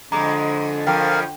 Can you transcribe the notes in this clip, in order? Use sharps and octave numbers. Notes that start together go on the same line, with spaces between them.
F2 D3 G#3 A#5 D6
F2 F3 A#4 F5 G5